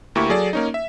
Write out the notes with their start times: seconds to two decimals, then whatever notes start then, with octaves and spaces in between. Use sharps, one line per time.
0.15 D2 A#3 E4 G4 C#6
0.30 F#3 G#4 A4 D5
0.53 A#3 C#4 D#4
0.74 E5